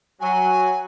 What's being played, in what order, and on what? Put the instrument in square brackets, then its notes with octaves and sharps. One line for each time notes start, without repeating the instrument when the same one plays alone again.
[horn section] F#3 [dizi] G#5